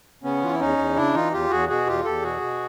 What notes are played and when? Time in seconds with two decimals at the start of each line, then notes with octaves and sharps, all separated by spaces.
0.24 C#3 B3 C#4
0.42 E3 F4
0.52 E4
0.60 E2 C#4 D#4
0.78 E2
0.96 C#3 D4 E4
1.14 E3 D#4 F4
1.32 E2 F4 G4
1.50 E2 F#4 G#4
1.69 B2 F#4 G#4
1.87 E2 F4 G4
2.05 E2 G4 A4
2.22 B2 F#4 G#4
2.41 B2